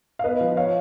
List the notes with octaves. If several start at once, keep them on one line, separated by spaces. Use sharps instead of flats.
F5
B3 B4 D#5
F3
C#5 F5